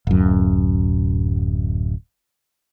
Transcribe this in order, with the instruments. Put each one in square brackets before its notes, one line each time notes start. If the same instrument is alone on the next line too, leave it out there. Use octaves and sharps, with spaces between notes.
[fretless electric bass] D1 F#2